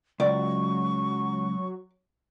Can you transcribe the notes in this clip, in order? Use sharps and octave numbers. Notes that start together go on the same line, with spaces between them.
C#2 F#3 D5 C#6